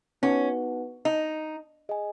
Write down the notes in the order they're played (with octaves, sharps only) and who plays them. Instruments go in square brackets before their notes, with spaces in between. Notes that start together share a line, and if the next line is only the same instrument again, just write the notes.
[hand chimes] B3 D#4 F#4 B4 F#5 [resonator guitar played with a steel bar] C#4
[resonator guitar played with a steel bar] D#4
[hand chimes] G#4 D#5 G#5